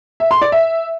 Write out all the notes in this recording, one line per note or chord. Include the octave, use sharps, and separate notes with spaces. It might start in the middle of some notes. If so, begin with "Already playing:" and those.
E5
C6
D5
E5